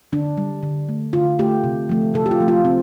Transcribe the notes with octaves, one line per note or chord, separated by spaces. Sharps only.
D3 D4
G3
D3
A3
D3 F4
A3 G4
C3
F3 A3
C3 A4
G4
F4
F3 A3
F4
C3 C4